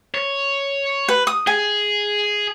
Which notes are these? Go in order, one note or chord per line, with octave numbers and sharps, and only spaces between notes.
C#5
B4
D#6
G#4 G#5